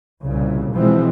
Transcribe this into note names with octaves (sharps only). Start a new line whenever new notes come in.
C2 A#2 C#3
B2 E3 F3 G#3 C4